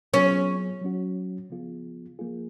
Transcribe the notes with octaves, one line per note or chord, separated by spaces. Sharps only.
F#3 B3 C#4 F4 G#4
F#3 C#4 F#4
C#3 F3 B3 F4 G#4
F3 A#3 F4 G#4